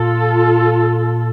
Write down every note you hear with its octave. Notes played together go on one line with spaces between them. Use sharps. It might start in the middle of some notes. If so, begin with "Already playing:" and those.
Already playing: A#2 F4 A4